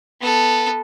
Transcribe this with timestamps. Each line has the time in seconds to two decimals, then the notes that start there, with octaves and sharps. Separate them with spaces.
0.21 B3 A4